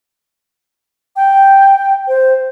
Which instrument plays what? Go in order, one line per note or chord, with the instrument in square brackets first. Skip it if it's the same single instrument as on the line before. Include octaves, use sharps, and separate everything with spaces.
[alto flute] G5
C5